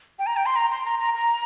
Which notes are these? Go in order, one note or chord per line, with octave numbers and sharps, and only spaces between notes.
G5
A#5
G5
C6
A#5
C6
A#5
A#5
A#5